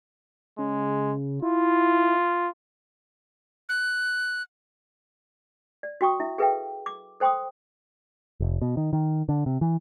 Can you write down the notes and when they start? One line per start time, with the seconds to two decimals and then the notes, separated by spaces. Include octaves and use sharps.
0.59 C#3 G#3
1.42 E4 F4
3.69 F#6
5.83 D5
6.01 F#4 G5 C#6 D#6
6.20 E4 E5
6.38 G#4 A4 B4 E5 F5 G5
6.86 D6
7.20 A4 C5 G5 C6 D6 D#6
8.40 F1
8.62 B2
8.77 D#3
8.93 D#3
9.29 D3
9.46 C3
9.61 E3